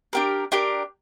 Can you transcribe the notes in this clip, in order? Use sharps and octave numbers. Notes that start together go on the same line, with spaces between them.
D4 G4 A#4
D4 G4 A#4